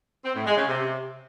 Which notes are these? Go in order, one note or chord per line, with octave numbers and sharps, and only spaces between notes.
C4
A2
G#3
C#3
C3